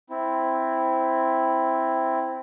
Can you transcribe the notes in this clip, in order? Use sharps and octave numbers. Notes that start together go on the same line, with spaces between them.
C4 E4